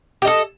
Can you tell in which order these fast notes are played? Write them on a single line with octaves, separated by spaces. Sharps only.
G4 D#5 A4